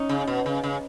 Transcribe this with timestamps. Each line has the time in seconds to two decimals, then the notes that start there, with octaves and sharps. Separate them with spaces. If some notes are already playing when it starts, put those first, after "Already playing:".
Already playing: C#4 D#4
0.09 C#3
0.27 B2
0.46 C#3
0.63 C#3